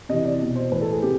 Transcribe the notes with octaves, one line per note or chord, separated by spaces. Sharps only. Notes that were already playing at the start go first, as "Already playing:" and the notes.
C3 E3 D#5
D5
B2
C5
A2 E3 B4
A4
G#4
C3 G4